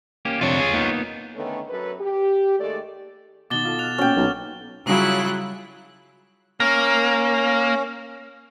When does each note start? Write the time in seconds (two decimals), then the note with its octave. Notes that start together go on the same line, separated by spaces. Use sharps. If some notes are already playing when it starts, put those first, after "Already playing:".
0.25 A#3 C#4 G4
0.41 F2 C3 D4 F4 C#5
0.59 G#4
0.73 A#3 B3 D#4
1.35 D3 D#3 A3 B3 C#4
1.70 F#2 A4 B4
2.00 G4
2.60 D#2 G#3 A3 A4 D5
3.50 B2 D#3 D#4 D6 A6 G7
3.65 F4 A4
3.79 F6 F#6 F7
3.98 A#2 C#4 F#4 G5
4.17 B1
4.85 C#3 F#3 G3 E4 F4 F#6
6.60 A#3 C#4